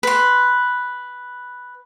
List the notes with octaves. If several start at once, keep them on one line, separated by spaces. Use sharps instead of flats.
B4 C6